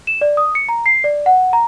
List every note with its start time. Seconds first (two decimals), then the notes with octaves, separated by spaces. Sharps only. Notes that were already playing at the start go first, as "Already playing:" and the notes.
0.07 E7
0.21 D5
0.37 D#6
0.55 C#7
0.69 A#5
0.86 C7
1.04 D5
1.26 F#5
1.53 A#5